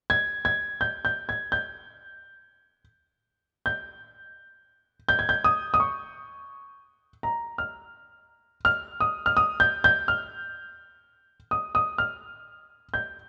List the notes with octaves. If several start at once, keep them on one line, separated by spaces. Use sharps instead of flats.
G#6
G#6
G6
G6
G#6
G6
G6
G6
G#6
G6
D#6
D#6
C#6
A#5
F6
F6
D#6
F6
D#6
G6
G6
F6
D#6
D#6
F6
G6